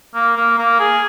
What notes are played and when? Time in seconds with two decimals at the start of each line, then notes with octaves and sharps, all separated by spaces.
0.15 A#3
0.36 A#3
0.58 A#3
0.79 G#4